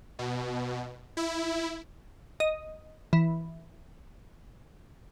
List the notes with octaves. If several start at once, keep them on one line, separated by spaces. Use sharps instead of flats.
B2
E4
D#5
E3